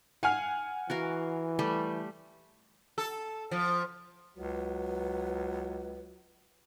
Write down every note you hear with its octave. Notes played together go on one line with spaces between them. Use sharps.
F5 F#5 G#5 F6
E3 F#4 A#4 F5
G3 A3 G4
A4
F3
C#2 F#3 B4